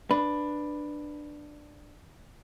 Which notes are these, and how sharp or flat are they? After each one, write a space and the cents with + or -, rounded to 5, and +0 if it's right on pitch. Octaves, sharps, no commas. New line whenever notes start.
D4 +10 B4 +0